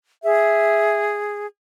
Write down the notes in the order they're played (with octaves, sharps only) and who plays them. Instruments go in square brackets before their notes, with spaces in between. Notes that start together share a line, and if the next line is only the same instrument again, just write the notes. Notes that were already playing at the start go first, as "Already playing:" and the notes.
[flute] G#4 [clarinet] E5